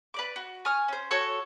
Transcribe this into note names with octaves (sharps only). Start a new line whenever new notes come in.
B4 D5 D6
F#4
G#5 C#6 D#6 F6
C#4 C5
F#4 A4 C#5 C#6